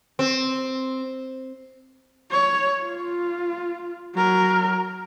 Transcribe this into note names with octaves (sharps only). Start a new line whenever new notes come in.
C4
C#5
F4
F#3 A#4